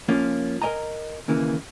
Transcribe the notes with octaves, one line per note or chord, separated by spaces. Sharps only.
F3 A#3 C#4 F4
A#4 D#5 G#5 A#5
D#2 C#3 E3 A#3